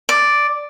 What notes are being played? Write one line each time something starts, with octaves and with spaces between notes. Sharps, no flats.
D5